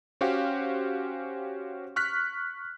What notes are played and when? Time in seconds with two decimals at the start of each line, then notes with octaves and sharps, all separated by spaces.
0.21 C#4 F#4 G4 C5 F5
1.96 C#6 F6 F#6 B6